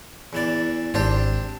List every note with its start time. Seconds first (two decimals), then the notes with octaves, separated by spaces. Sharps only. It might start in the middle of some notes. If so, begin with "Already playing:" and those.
0.33 E2 E3 D5
0.94 G#1 C4 D4 G4